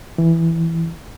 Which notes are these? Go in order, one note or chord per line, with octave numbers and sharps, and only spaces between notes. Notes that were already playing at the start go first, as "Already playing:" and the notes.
E3